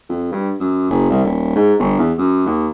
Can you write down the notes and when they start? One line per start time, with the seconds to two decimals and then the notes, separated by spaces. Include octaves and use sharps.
0.09 F2
0.32 G2
0.60 F#2
0.90 F#1
1.10 C2
1.24 D#1
1.55 G#2
1.79 G1
1.98 E2
2.18 F#2
2.46 D#2